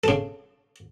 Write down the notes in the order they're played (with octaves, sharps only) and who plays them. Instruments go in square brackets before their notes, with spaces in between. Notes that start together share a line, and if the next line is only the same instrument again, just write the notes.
[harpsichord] C#3 A4